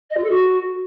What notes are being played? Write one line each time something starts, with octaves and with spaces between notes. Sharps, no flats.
D#5
F4
A4
F#4